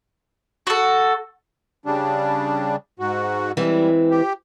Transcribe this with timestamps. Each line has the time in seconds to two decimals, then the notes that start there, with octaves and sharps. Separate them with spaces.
0.67 F#4 A4
1.86 C#3 G3 D4
2.99 G#2 F#4
3.57 E3 G3 G#3 C4
4.11 G4